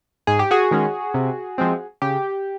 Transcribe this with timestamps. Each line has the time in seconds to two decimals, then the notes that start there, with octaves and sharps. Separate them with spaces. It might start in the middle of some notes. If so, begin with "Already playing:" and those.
0.27 G#2 G#4
0.39 G4
0.51 F#4 G#4
0.71 D#3 G#3 C#4
1.14 C3
1.58 F3 G#3 C4
2.02 C#3 G4